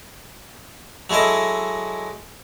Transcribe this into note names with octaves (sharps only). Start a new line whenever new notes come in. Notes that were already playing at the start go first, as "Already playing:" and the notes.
F#3 G#3 E4 A4 D#5